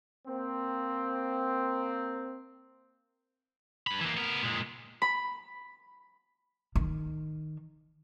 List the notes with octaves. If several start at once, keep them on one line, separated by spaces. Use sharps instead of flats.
A#3 C4
G2 B5
E3 A#3
B3 A#4
A#2 G#3
B5
D#3